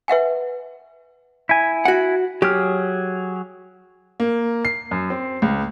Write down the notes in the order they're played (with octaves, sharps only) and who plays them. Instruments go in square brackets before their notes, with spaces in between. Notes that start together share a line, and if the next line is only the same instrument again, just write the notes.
[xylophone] B4 E5 F#5 G#5
[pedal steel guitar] E4 G#5
[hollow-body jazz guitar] F#4 F#5
[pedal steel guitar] F#3 G#4 F6 [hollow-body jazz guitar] G4
[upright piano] A#3
C7
F#2
C4
C#2